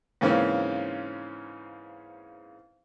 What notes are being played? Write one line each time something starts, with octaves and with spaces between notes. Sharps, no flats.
G#2 C#3 E3 A#3 C4 C#4